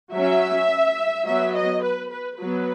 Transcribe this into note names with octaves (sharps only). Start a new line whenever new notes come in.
F#3 C#4 E5
F#3 B3 E5
D#5
B4
B4
F#3 B3 B4